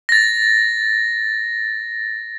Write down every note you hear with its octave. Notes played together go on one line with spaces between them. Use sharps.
A6 A#6